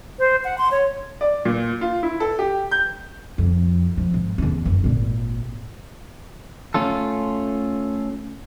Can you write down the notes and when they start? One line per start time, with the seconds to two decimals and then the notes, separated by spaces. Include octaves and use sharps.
0.19 C5
0.44 F#5
0.58 C6
0.71 C#5
1.21 D5
1.45 A#2
1.81 F4
2.03 E4
2.20 A4
2.39 G4
2.71 G6
3.38 F2
3.97 F3
4.14 G#2
4.38 E2 C#3
4.66 F#1
4.84 G#1 A#2
6.74 A3 C#4 F4 A4